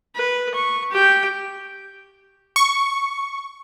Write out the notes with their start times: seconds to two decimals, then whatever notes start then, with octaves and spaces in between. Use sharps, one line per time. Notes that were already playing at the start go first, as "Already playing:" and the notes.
0.15 B4
0.54 C#6
0.91 G4 G5
2.56 C#6